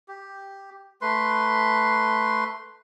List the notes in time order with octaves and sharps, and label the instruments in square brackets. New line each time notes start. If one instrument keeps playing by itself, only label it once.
[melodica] G4
A3 B4 C6